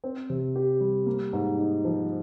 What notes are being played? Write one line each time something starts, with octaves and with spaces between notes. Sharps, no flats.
C4
C3
G4
G3
A#3
G#2
D#4
F3